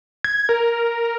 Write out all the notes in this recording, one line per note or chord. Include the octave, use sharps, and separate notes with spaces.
G#6
A#4